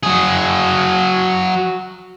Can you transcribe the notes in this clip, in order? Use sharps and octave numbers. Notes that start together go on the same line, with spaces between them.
F#3 G#4